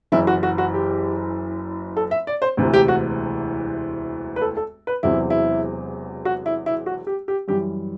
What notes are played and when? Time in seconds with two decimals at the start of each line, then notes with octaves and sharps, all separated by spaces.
0.12 F#1 F#2 E3 E4
0.27 F#4
0.43 F#4
0.58 F#4
0.74 G4
1.97 A4
2.11 E5
2.27 D5
2.42 C5
2.57 E1 D2 C3 E3
2.74 G4
2.88 F#4
4.36 B4
4.41 A4
4.57 A4
4.87 B4
5.03 E1 E2 C3 F#3 C4 E4
5.30 E4
6.25 F#4
6.46 E4
6.66 E4
6.86 F#4
7.07 G4
7.28 G4
7.48 F#2 E3 G3 G4